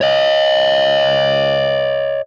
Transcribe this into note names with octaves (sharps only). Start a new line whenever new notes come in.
C#5 D#5